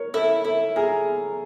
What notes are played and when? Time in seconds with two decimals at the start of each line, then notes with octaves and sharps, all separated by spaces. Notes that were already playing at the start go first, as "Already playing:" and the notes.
Already playing: A#4 C#5
0.14 E4 A4
0.45 E4 A4
0.76 G#4 A#4